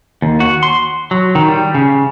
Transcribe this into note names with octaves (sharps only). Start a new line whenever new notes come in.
D#2
F#4
C6
F#3
D#3
G3
C#3